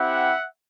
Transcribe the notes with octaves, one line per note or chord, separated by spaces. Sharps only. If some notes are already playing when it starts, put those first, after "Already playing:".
Already playing: C4 E4 G4 E5 F#5